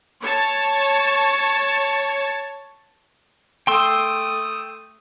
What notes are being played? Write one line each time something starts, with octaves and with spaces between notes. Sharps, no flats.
C#5 A5
A3 G5 C6 D#6 E6